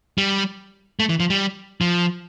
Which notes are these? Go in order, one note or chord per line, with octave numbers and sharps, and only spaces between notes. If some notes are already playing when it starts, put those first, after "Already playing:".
G3
A3
E3
F3
G3
F3